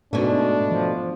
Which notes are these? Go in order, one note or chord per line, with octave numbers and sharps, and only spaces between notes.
G#2 B2 A3 D4
F3